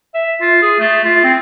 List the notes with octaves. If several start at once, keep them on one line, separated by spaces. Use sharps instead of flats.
E5
F4
G#4
A3
F4
C4